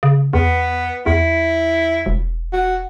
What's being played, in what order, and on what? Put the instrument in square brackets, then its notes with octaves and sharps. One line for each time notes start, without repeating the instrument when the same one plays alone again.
[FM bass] C#3
[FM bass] E2 [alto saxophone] B3
[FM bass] E2 [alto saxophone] E4
[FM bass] E1
[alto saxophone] F#4